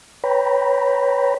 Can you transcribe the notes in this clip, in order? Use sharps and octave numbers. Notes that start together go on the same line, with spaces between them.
B4 C#5 G5 A#5 B5